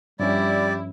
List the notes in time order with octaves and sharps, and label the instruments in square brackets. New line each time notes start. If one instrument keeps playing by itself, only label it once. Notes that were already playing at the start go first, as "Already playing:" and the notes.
[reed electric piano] G2 F3 C#4 [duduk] G3 [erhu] E4 [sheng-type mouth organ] D5